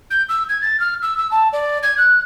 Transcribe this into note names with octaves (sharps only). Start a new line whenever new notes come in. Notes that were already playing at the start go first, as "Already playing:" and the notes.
G6
E6
G#6
A6
F6
E6
E6
A5
D5
G#6
F#6